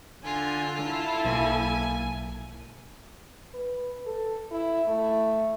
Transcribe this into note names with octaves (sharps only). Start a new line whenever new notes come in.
D3 F4 G#5
E4 A4
B1 A#3 G#5
B4
A4
E4
A3